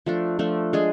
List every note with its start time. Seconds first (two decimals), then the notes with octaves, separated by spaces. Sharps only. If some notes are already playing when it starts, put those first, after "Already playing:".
0.06 F3 A3 D4
0.39 F3 A3 D4
0.73 G#3 D4 G#4